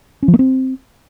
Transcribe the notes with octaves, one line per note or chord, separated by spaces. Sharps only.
C#4
F3
A#3
C4